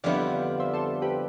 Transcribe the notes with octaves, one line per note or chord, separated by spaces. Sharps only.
F2 D3 G3 B3 E4 D5 F5
C5 E5
A4 C5
G4 B4